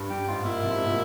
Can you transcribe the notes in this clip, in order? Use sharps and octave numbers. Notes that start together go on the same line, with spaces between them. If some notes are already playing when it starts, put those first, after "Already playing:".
Already playing: G2
G2 G4
G#2 F4
A#2 E4
C3
G#2
A#2